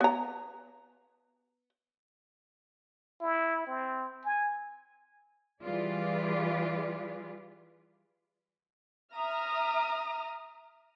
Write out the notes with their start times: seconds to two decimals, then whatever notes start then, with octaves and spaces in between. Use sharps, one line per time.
0.01 B3 A#5
3.21 E4
3.67 C4
4.25 G#5
5.62 E3 G3 F4 G#4 B4 D5
9.14 E5 A#5 D#6 F6